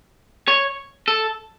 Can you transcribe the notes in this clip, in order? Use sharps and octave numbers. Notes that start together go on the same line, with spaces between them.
C#5
A4